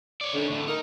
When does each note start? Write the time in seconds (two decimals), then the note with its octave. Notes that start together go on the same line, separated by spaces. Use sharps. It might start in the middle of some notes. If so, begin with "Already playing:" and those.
0.21 C#5 D5
0.34 D3 D#3 C#4
0.51 D2 A2
0.68 D#4 A#4